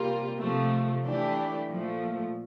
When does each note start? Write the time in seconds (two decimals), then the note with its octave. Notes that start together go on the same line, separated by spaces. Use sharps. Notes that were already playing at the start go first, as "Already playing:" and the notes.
Already playing: C3 G3 A#3 F4
0.39 C3 F3 A3
1.04 E3 A3 D4 G4
1.68 A#2 F3 A3